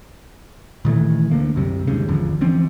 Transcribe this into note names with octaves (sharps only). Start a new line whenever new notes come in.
A#2 D#3 E3 A3
D2 D3 A#3
C2 F#2 C3 G3
D#2 G#2 C#3
G#1 E2 D3 F3
E3 F3 C4 C#4